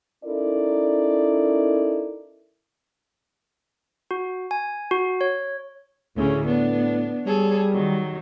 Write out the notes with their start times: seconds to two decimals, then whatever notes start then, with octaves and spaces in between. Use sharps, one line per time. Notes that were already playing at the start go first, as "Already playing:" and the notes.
0.25 C#4 D#4 E4 A4 A#4 D5
4.11 F#4
4.51 G#5
4.91 F#4
5.21 C#5
6.16 D2 A2 C#3 C#4
6.47 B3 D4
7.26 G3 G#4 A4 C#5
7.71 D#3 F#3